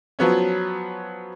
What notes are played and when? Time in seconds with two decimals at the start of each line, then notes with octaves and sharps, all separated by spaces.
0.19 F3 F#3 B3 C#4